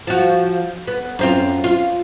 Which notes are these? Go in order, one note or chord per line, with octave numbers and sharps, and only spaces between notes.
F3 F#4
B3
F#2 C4 F4
F4